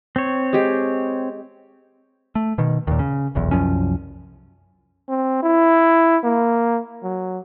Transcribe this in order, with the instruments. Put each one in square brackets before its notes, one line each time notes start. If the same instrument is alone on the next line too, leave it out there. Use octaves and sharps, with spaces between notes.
[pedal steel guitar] C4 C#5
[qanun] G#3 G4
[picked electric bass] A3
B2 D#3
D#2 A#2
C#3
F1 B1 E2
C2 F#2 F3 C#4
[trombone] C4
E4
A#3
F#3